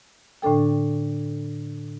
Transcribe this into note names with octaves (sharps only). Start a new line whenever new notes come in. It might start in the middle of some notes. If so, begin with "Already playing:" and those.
A2 D3 D4 A4 G5